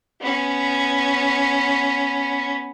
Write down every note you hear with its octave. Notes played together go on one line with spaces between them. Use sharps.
B3 C#4